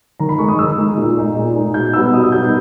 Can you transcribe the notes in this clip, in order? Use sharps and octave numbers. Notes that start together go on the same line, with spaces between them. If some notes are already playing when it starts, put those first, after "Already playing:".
D#3 A#5
B5
G#3 D#4 C#6
D#6
D#3 E6
G#3 D#4
A#2
G#3 D#4
A#2
G#3 D#4
B2 G6
G3 B3 D#4 E6
B2 D#6
E6
G3 B3 D#4 G6
G6